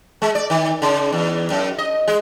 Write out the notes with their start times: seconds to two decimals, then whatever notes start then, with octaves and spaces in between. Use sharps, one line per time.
0.22 G#3
0.35 D5
0.50 D#3
0.82 C#3
1.12 E2
1.50 F#2
1.78 D#5
2.08 G#3